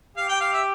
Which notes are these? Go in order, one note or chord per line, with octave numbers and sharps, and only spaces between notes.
G4 F5
G5
F5
E5